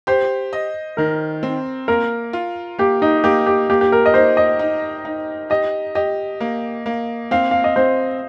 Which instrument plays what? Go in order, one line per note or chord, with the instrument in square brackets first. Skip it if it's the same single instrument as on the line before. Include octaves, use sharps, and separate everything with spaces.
[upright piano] G4 [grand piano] C5
[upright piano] D#5
[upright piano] D#3 [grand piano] A#4
[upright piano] C4
[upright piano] A#3 [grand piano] A#4
[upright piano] F4
[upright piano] A#3 [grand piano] G4
[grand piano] D#4
[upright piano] A#3 [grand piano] G4
[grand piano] G4
[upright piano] A#3 [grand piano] G4
[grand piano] G4
A#4
D#5
[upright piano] D#4 [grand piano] C5
[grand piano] D#5
[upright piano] D#4
D#4
[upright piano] G4 [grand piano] D#5
[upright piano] G4 [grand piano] D#5
[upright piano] A#3
A#3
[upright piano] C4 [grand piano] F5
[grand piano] F5
D#5
[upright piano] C4 [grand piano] C5